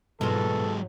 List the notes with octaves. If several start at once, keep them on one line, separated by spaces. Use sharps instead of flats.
G#2 B2 F#3 G#3 F4 A4